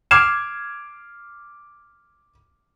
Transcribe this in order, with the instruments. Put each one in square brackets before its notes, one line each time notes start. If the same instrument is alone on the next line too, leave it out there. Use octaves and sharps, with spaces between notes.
[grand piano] D6 F6 G#6 C7 E7